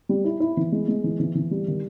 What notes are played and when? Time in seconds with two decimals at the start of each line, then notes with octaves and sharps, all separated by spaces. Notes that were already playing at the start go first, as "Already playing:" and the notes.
0.09 G3
0.25 E4
0.40 E4
0.57 E3
0.72 G#3
0.88 G#3
1.04 E3
1.20 E3
1.35 E3
1.51 G3
1.68 D#3